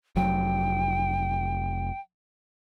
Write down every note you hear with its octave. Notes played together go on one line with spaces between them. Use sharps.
F1 F#3 G5